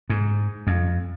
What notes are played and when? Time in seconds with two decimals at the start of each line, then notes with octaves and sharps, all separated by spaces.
0.10 G#2
0.67 F2